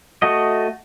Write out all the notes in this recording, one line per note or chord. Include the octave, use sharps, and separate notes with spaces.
A3 F#4 D#5